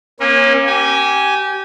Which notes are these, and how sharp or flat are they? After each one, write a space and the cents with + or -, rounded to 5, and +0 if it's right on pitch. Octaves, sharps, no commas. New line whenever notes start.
A#3 +25 C#4 -25
G4 -20 G#5 +0